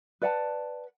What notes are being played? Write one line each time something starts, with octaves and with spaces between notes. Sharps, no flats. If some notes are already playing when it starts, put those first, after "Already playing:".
B4 D5 F#5 A5